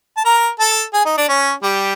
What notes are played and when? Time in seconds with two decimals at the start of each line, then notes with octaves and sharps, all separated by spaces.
0.17 A5
0.25 A#4 A#5
0.60 A4 A5
0.94 G#4 G#5
1.05 D#4 D#5
1.17 D4 D5
1.28 C#4 C#5
1.63 G3 G4